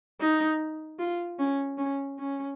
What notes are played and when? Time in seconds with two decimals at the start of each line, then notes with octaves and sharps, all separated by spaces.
0.20 D#4
0.99 F4
1.39 C#4
1.78 C#4
2.19 C#4